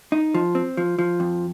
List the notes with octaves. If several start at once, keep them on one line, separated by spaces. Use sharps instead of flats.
D#4
F3
C4
F3
F3
F2